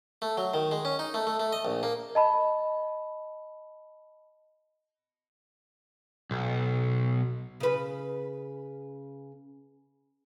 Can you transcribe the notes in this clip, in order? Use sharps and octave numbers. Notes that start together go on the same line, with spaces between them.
A3
F#3
D#3
G#3
C#4
D#4
A3
A3
A3
D#5
A#1
A#3
D#5 A5 B5
B1
C#3 B4